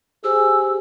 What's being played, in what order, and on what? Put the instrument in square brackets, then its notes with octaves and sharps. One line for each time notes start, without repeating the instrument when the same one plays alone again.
[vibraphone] G4 C5 [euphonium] G#4 [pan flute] E6